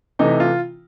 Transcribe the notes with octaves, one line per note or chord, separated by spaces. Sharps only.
C3 E3 A3 D#4
F4